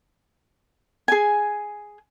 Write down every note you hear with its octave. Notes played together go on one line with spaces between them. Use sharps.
G#4 G#5